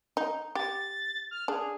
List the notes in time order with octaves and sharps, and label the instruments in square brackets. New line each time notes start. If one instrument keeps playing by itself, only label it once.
[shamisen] D#4
[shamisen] G4 [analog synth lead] A6
[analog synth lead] F6
[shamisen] D4 [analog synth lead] G#4